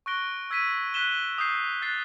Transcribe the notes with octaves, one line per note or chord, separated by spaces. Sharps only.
C#6 F#6 A#6 D7 G7
E6 G#6 B6 D#7
F#6 B6 E7 G7
D#6 G6 C7
F#6 A6 C7